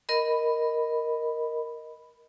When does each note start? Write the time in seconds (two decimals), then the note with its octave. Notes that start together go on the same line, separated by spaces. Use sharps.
0.09 A#4 D#5 B5